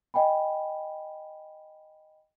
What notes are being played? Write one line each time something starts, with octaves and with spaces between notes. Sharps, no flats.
D#5 G5 G#5 B5